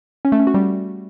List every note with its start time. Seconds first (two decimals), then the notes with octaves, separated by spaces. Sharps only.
0.25 C#4
0.32 A3
0.40 C#4
0.47 F#4
0.54 G3